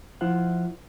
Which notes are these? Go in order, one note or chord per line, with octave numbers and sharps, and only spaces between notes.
F3 E4 F4 C5 F#5